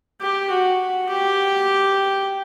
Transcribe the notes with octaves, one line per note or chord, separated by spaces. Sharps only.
G4
F#4
G4